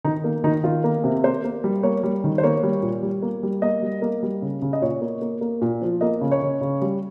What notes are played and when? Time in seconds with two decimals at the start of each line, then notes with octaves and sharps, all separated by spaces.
0.04 D#3 D#4
0.24 A#3
0.44 D#3 D#4
0.64 D#3 F4
0.84 A#3
1.04 C3
1.24 A#3 C5
1.44 A#3
1.64 G3
1.83 A#3 C#5
2.03 G3
2.24 D#3
2.38 C5
2.43 A#3 C#5
2.63 G3
2.82 A#2
3.03 G3
3.22 A#3
3.43 G3
3.62 A#3 D#5
3.82 G3
4.02 A#3
4.23 G3
4.42 C#3
4.62 C#3
4.73 D#5
4.82 A#2 C#5
5.01 A#3
5.21 A#3
5.41 A#3
5.61 A#2
5.82 F3
6.01 A#3 D#5
6.21 C#3
6.31 C#5
6.42 C#3
6.61 C#3
6.82 G3